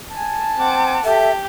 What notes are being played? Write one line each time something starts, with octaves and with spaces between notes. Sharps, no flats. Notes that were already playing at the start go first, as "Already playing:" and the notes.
G#5 A5
C4 F#5 D6
G4 A4 E5